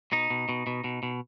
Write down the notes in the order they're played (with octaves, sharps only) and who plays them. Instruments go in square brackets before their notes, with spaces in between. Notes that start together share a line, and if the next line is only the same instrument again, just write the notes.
[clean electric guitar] B2 D#4
B2
B2
B2
B2
B2